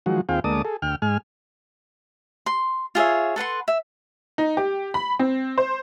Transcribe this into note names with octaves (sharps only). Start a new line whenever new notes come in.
D#3 F3 F#3 G#3 F#4
D#2 C4 F4 G#4 F5 G5
D2 G#3 A#3 D5 A5 D#6
G#4 A4
D2 G5 F6
G#2 G#3 G#5 F6
C6
F4 G#4 C#5 E5
A4 B4 F#5 C6
E5
D#4
G4
B5
C4
C5